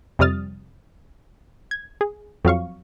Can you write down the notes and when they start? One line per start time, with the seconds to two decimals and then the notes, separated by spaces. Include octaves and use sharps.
0.19 F2 C3 G3 D#6 F6 A6
1.71 G#6
2.01 G#4
2.45 F2 F#3 F5 C#6